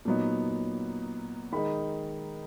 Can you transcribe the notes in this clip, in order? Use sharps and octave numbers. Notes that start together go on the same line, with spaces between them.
A#2 F#3 B3 D#4
D#3 G#3 D#4 B5